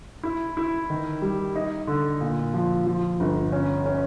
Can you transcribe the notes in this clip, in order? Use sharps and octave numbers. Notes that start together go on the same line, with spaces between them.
E4
E4
D#3
G3
D#4
D3
A#2
F3
F3
G1
C#4
C#4